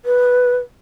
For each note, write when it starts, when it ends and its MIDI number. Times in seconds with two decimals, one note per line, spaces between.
0.05 0.57 71